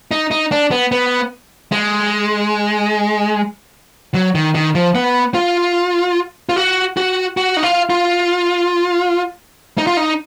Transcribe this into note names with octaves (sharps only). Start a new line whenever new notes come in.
D#4
D#4
D4
B3
B3
G#3
F#3
D#3
D#3
F3
B3
F4
F4
F#4
F#4
F#4
D#4
F4
F4
D#4
F4
D#4